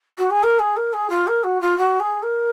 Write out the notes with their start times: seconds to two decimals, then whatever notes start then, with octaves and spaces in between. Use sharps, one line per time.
0.18 F#4
0.30 G#4
0.43 A#4
0.59 G#4
0.77 A#4
0.93 G#4
1.10 F4
1.27 A#4
1.44 F#4
1.61 F4
1.78 F#4
2.00 G#4
2.23 A#4